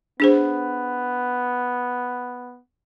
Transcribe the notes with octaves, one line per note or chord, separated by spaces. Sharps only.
B3 D4 G#4 C5